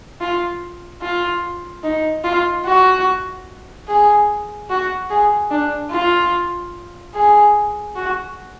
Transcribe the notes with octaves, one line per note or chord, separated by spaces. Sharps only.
F4
F4
D#4
F4
F#4
G#4
F#4
G#4
D4
F4
G#4
F#4